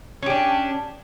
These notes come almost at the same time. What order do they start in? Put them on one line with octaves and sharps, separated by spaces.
C#4 G4 D4